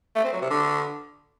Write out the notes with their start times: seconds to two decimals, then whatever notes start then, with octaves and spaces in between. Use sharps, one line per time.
0.16 A3
0.24 C4
0.33 F#3
0.42 C3
0.51 D3